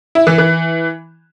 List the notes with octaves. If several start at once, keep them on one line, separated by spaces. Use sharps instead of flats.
E4
E3
E3